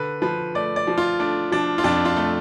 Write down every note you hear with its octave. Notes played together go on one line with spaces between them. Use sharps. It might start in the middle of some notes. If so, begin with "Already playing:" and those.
Already playing: D3 B4
F3 B4
A3 D5
D5
F3
F4
A3 D4
F3 D4
F4
F2 D4
F4
A3